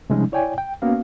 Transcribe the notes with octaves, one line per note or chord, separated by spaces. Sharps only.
C3 F3 G3 G#3 C#4 D#4
E4 C#5 D5 G5 G#5
G5
A#3 B3 C#4 F#4 F5